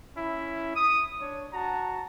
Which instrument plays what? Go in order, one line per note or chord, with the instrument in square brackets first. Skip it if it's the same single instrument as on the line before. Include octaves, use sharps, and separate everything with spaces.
[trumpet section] C#4 E4
D#6
D4 C#5
F#4 A5 A#5